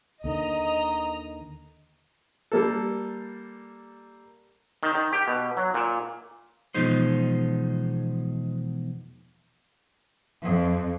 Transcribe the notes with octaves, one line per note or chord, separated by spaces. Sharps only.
D#2 D3 D#3 D#5 A#5
G3 A#3 A4
D#3
D#3
G4
B2
F#3
A#2
E2 B2 F3 G#3 D#4 C5
F2